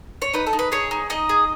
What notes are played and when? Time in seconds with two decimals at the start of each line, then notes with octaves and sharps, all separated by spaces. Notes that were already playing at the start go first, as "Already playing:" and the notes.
0.22 C#5
0.33 D#4 B4
0.47 A4
0.53 D#4
0.59 B4
0.72 G#4 C#5
0.91 D#4
1.10 D#4 D#5
1.29 G#4